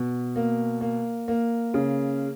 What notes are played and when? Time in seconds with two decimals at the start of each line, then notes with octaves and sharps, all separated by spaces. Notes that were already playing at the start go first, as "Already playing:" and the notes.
Already playing: B2
0.36 A#3
0.81 A#3
1.28 A#3
1.74 C#3